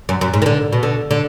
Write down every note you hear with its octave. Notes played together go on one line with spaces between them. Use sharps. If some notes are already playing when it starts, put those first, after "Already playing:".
F#2
F#2
G#2
D#3
D3
B2
D3
D3